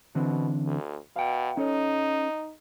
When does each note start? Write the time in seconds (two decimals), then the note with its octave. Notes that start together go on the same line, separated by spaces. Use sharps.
0.15 B2 D3 E3 C4
0.66 D2
1.16 B2 F5 G5
1.57 C#4 D#4 A4 C#5